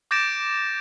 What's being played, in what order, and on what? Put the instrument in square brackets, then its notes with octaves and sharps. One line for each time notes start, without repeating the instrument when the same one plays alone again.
[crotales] D6 G6 A6 A#6 D7 E7